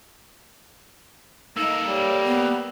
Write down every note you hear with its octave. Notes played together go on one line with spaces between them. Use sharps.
A#3 D#4 A4 E6
G3 C#5
B3